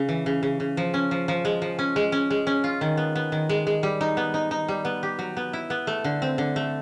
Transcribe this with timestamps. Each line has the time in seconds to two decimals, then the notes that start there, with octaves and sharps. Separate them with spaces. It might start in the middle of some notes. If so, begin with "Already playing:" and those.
Already playing: C#3
0.09 E3
0.26 C#3
0.43 C#3
0.60 C#3
0.77 F3
0.94 C#4
1.11 F3
1.28 F3
1.45 G#3
1.62 F3
1.79 C#4
1.96 G#3
2.12 C#4
2.30 G#3
2.47 C#4
2.64 F4
2.81 D#3
2.97 B3
3.15 B3
3.32 D#3
3.49 G#3
3.67 G#3
3.83 G3
4.01 D#4
4.17 B3
4.34 D#4
4.51 D#4
4.68 G3
4.85 B3
5.03 G4
5.19 F#3
5.37 B3
5.53 E4
5.70 B3
5.87 A3
6.04 D3
6.22 C4
6.38 D3
6.56 A3